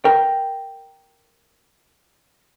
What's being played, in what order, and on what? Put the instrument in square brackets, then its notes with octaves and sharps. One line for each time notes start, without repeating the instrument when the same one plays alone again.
[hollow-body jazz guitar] A#4 G5